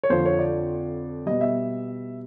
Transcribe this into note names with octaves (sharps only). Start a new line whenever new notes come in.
C#5
F2 D3 F3 C5
C#5
D5
B2 G3 D#5
E5